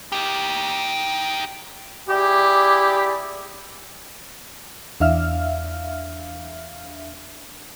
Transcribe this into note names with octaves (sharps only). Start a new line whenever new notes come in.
D#4 G4
E4 G4 G#4 D5
E2 D4 E5 F5 F6